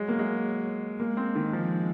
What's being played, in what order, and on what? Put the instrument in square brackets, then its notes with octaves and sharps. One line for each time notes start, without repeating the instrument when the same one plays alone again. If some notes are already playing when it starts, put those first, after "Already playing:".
Already playing: [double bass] F#3 [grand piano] G#3
[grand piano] A#3
G#3
[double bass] G#3 [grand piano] A#3
[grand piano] C4
D#3
F3